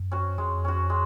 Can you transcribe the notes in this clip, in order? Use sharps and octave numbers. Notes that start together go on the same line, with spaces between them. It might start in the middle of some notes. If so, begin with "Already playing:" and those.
Already playing: F#2
C#4 F#4
F2 G#3
C#4 F#4
G#3